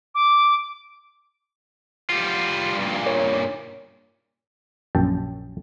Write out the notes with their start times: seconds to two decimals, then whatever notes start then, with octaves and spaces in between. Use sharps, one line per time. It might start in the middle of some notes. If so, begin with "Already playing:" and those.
0.15 D6
2.10 G3 F4
2.76 G2 A#2
3.06 A#4 C#5
4.95 A#1 F#2 G5 A5